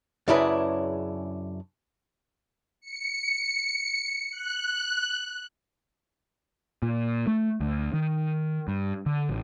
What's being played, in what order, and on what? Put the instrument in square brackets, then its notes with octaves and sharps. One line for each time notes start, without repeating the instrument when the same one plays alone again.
[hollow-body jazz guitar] F#2 C#3 D4 E4 G#4 B4
[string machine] C#7
F#6
[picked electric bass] A#2
A3
D2
D#3
G2
D3
A1